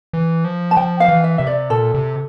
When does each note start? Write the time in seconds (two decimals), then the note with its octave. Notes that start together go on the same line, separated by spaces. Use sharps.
0.13 E3
0.45 F3
0.71 A5
0.77 F3 G5
1.00 F5
1.08 E3
1.24 E5
1.38 C3 E5
1.47 D5
1.70 A#2 A4
1.95 C3